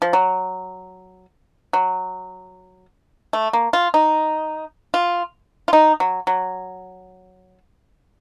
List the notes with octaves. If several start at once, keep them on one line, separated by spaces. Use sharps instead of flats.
F3
F#3
F#3
A3
A#3
F4
D#4
F4
F4
D#4
F#3
F#3